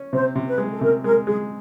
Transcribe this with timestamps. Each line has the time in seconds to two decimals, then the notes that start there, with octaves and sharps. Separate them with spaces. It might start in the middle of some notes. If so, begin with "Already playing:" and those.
Already playing: C#4
0.13 C3 C5
0.35 C3
0.47 B4
0.58 G#3
0.73 A4
0.81 C3 A#4
1.04 G#3 A#4
1.27 G#3 G#4